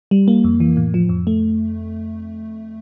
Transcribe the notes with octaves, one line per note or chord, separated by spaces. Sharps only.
G3
A#3
F2
E3
A2
F3
F2
A3